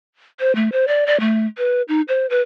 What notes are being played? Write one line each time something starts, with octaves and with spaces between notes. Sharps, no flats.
C5
A3
C5
D5
D5
A3
B4
D#4
C5
B4